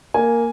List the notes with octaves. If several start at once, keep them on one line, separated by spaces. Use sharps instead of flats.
A#3 G#5